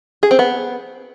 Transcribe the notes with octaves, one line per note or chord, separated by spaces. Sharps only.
G#4
C4
B3